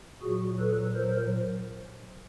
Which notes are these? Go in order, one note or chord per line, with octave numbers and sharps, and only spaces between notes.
A#2 F#3 F#4 G#4
A4 B4
A#4 C5